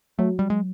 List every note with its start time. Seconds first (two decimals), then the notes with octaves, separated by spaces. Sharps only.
0.19 F#3 A3
0.39 G3
0.50 G#3